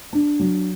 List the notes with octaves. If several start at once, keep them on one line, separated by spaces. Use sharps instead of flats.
D4
F#3